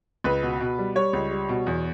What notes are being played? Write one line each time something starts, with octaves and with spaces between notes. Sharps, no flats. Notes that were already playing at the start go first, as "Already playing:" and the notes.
C#2 B4
B2
B2
G3
G3 C#5
C#2
G3
B2
E2